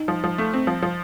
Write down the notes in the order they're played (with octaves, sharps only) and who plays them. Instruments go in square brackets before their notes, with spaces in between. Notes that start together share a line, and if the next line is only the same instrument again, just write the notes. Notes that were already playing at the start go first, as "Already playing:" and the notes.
Already playing: [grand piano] D#4
[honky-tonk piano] F3
F3
A3
C4
F3
F3